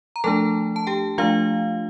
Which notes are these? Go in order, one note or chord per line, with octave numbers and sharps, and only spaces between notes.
A#5
F3 A3 D4 A4 A5
A5
G4 G5
F3 A3 D4 F4 F5